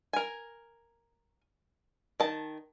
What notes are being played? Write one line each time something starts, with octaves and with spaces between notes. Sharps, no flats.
A#4 G#5
D#3 A5